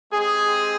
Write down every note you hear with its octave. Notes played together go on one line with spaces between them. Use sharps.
G#3 C4 G4 G#4